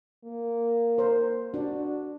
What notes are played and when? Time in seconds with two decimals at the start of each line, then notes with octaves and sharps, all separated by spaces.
0.24 A#3
0.98 A#4 C5
1.54 D4 F#4